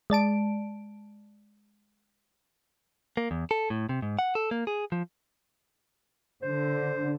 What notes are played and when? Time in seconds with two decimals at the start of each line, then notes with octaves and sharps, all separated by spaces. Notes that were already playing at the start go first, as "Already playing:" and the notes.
0.10 G#3 D5 A5 D7
3.17 A#3
3.31 E2
3.51 A4
3.70 A2
3.89 C3
4.02 G#2
4.19 F#5
4.35 A4
4.51 A#3
4.67 G#4
4.92 F3
6.43 D3 C5